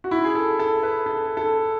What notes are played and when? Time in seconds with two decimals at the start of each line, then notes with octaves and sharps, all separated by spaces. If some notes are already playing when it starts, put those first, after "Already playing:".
0.04 F#4
0.11 E4
0.24 G#4
0.35 A4
0.59 A4
0.83 B4
1.06 A4
1.37 A4